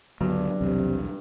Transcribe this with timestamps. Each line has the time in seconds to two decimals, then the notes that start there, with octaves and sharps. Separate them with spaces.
0.21 C#2 G2 D3 F#3 B3
0.61 B1 E2 C3